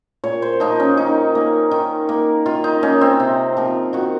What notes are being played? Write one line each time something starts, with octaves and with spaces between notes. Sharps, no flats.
A#2 C#5
C5
F3 A#3 D#4
C#4
D#3 D#4
A#3
D#3
A#3
D#3 F4
D#4
A#3 C#4
C4
C3
F3 A#3
D#3 F#4